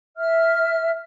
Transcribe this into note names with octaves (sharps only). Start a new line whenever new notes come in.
E5 F6